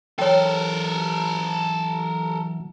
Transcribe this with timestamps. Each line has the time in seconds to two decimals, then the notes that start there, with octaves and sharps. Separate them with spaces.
0.19 E3 F#3 A4 A#4 C#5 G5